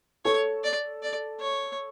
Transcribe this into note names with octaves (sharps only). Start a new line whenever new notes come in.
A4 C#5
D5
D5
C#5